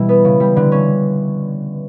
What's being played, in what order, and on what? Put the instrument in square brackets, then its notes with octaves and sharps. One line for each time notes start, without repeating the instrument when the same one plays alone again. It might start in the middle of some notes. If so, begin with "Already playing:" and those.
Already playing: [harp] B2 E3 G3 E4
B3
C#3
G3
D3
C#4